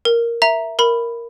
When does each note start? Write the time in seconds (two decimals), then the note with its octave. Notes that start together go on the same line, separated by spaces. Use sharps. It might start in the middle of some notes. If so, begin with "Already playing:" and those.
0.05 A#4
0.42 E5 A#5
0.79 A#4 B5